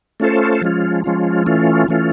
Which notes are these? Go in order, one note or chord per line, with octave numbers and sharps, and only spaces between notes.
A3 C#4 F4 A4 C5
F3 G#3 C#4 F4
F3 G#3 C#4 F4
E3 A3 C#4 F4
E3 A3 C#4 F4